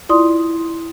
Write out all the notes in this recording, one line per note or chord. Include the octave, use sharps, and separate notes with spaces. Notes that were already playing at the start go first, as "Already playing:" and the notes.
E4 F4 D5 C6 D#6